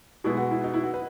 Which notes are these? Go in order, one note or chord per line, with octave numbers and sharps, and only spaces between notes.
B2 G#3 B3 E4
F#4
E4
D#4
E4
F#4
B4